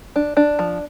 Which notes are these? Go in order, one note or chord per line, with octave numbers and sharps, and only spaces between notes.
D4
D4
F3